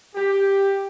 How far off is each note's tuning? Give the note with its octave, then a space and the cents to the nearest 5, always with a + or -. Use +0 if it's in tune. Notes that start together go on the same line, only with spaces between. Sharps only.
G4 +5